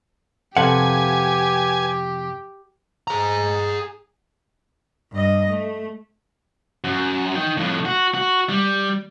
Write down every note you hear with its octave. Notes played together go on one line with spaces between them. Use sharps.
F2 C3 G4 A4 B4 F5 F#5 G#5
G#4 A#5
G2 D#5
A3
F#2
D#4 G5
F2 A2
F#4
F#4
G3